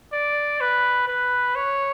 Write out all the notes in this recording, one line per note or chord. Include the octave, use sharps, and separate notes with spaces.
D5
B4
B4
C#5